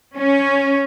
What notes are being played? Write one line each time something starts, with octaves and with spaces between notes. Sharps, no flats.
C#4